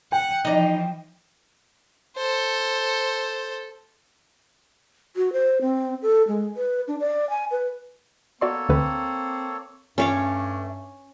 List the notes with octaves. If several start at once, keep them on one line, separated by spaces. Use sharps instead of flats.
F#5 G5
E3 F3 D#4 D5
A4 C5
F#4
C5
C4
A4
G#3
B4
D4
D5
G#5
B4
A#3 B3 F#4 A4 C#5 D5 C6
D2 D3 C4 B4
G2 A3 C#4 C#5 D6